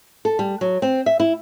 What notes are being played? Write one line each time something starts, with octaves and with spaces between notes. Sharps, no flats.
A4
G3
F#3
C4
E5
E4